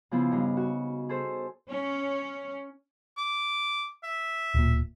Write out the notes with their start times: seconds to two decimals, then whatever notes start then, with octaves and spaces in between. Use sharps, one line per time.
0.11 C#3 F3 B3 E4
0.31 G2 C#3 D#4
0.57 F#4
1.09 G#4 A4 C5
1.68 C#4
3.17 D6
4.03 E5
4.54 D1 A#2